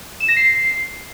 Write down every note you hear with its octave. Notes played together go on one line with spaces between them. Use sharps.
E7
A#6
C7